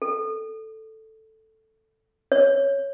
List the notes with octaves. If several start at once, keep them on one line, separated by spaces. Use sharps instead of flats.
A4
C#5